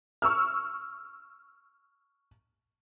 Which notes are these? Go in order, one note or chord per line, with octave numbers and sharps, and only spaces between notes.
C#6 E6 F6